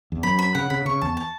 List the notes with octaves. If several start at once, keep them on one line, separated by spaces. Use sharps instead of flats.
E2
F#2 B5
B5
C#3 F#5
C#3 B5
C#3 C#6
E2 A5
A5